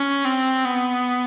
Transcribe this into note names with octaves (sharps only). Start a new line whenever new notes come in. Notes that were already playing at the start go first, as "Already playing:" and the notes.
Already playing: C#4
C4
B3